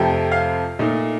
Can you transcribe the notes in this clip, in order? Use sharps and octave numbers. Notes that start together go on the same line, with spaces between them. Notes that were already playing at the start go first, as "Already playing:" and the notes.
Already playing: F2 C3 F3 A3 G5
F5
A#2 A3 D#4